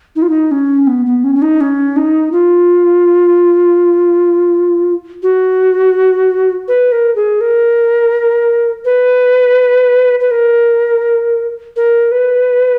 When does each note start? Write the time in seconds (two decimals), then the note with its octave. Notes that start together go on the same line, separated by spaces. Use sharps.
0.16 D#4
0.22 F4
0.29 D#4
0.51 C#4
0.87 B3
1.06 B3
1.24 C#4
1.36 C#4
1.42 D#4
1.61 C#4
1.96 D#4
2.32 F4
5.23 F#4
6.68 B4
6.92 A#4
7.16 G#4
7.41 A#4
8.85 B4
10.20 B4
10.31 A#4
11.76 A#4
12.12 B4